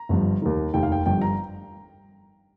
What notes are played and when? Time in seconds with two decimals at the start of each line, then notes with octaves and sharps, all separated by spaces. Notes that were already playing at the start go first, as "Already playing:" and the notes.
Already playing: A#5
0.09 G1 G2 F3
0.42 D#2 D#3
0.73 F1 D#2 D#3 G5
0.83 F5
0.92 G5
1.06 G1 G2 F3 G5
1.22 A#5